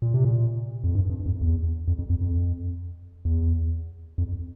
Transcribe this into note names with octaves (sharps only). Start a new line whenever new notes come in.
A#2
C3
A#2
F2
G2
G2
F2
E2
F2
F2
F2
F2
E2
F2